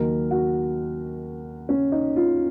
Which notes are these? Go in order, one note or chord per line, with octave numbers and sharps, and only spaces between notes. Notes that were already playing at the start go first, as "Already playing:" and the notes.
Already playing: D#2 D#3 F#3 A#4
F#4
C#4
D#4
F4